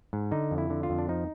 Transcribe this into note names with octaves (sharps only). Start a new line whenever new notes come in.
G#2
D3 D#4
F2
E4
D3
F4
F2
D4
F3 D#4